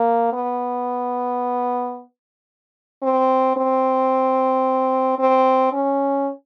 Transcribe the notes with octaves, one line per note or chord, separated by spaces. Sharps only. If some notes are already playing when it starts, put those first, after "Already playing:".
Already playing: A#3
B3
C4
C4
C4
C#4